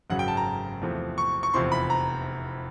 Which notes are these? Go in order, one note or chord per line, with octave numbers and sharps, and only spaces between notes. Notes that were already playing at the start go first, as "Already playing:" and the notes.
G#1 F#2 C#3 F#3 F#5
G5
A5
A#5
E2 C3 F3 A3
C#6
C#6
F1 E2 C3 F3 C6
B5
A#5